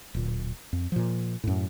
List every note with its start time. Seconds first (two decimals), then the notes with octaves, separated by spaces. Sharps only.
0.14 D1 A#2
0.73 F2
0.92 A#2 F3
1.44 F#2 A2